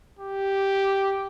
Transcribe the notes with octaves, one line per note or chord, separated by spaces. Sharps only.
G4